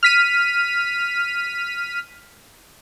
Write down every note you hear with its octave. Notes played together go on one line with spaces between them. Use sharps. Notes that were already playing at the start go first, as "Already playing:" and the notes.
F6 B6 D#7